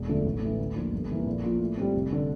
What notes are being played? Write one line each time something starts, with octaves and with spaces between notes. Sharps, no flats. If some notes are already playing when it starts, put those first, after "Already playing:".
Already playing: E1
D2 D3 F3 A3
A1
A2 E3
D2
D3 F3 A#3 F4
G1
F2 E3 A#3
A#1
A#2 F3 A#3 F4
A2
G3 C4
F1
D3